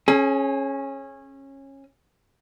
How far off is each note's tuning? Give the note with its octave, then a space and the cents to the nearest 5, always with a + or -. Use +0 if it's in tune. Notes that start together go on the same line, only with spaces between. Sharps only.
C#4 -20 G#4 +30